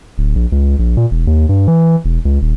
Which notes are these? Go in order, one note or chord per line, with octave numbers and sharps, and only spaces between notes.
D1
A#1
C#2
A#1
A#2
E1
D#2
G2
E3
E1
C#2
D#1